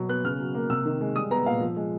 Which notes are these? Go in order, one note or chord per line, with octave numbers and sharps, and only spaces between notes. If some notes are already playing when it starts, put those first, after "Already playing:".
Already playing: B2 F#3
B3 F#6
C#3 F6
F#3
A#3
C3 E6
D#3
G#3
G3 D#6
B3 A#5
A#2 F5
F3
G#3